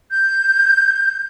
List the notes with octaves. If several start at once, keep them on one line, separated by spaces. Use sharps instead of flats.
G6